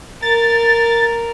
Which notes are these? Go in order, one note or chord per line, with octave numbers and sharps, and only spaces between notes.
A#4 A6